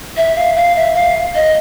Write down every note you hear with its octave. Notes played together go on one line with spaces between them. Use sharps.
E5
F5
F5
E5
F5
D#5